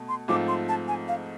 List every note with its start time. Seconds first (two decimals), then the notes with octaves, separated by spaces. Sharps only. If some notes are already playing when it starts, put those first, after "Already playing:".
Already playing: B2 A3 A4
0.09 C6
0.28 G#2 F3 A3 C4 F4 D6
0.48 C6
0.68 A5
0.88 G#5
1.08 F5